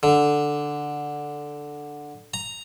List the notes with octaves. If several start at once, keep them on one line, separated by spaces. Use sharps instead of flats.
D3
A#5